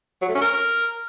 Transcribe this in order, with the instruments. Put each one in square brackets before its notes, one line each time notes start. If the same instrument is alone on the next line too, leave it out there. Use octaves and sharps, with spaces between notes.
[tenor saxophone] F#3
A3
C#4
A#4